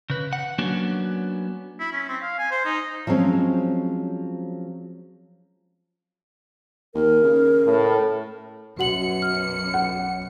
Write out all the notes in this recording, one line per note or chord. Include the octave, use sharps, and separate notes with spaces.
C#3 B4
F#5
F#3 A#3 B3 C#4 D4 F#4
E4
C#4
C4
F5
G#5
C5
D#4
F3 F#3 G#3 C4 C#4
D#2 A#4
C#3
A2
B1 F#2 F#4 F#5 C#7 F#7
F6
F#5